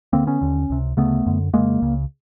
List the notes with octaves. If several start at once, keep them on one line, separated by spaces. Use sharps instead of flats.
D2 D3 A#3 C4
B3 C#4
D#2 D3
C#2 C3
D2 C#3 A3 B3
F#2 D3
F2 C#3 G#3 A#3
C#2 C#3